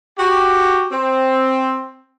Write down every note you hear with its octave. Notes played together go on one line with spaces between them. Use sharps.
F#4 G4
C4